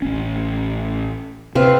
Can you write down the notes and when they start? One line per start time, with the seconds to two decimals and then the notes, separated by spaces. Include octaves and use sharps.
0.02 A1 C#4
1.55 C3 C4 B4 F5